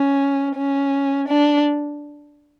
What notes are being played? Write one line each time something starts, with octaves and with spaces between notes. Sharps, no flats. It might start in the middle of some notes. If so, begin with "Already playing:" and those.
Already playing: C#4
C#4
D4